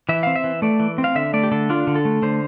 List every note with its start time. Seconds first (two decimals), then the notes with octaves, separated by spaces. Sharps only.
0.09 E3 E5
0.23 C4 F5
0.36 E5
0.44 E3
0.62 A3 D5
0.80 E3
0.98 C4
1.04 F5
1.15 D3 E5
1.33 A3 D5
1.44 G4
1.52 D3 A4
1.70 D4 F4
1.87 D3
1.96 A4
2.05 A3
2.22 D3 C5